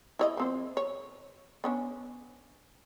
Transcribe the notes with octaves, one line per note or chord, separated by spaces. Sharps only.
E4 C#5 D#5
F3 C4 C5
C#5
B3 C#4 D4